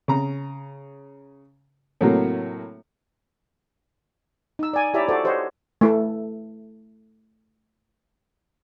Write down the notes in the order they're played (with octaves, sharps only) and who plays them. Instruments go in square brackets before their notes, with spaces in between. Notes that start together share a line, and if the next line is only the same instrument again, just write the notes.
[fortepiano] C#3 A#5
A2 C3 F#3 A#3
[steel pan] D#4 E6
D5 G#5
E4 G4 C#5 D5 E5 A#5
F#4 A4 C5 D5
G4 C5 C#5 D#5 F#5
A3 E4 A4